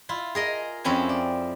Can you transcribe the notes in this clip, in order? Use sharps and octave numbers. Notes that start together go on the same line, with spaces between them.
E4 F4
G#4 A#4 D#5
F2 C4 C#4 E4 G#5
D5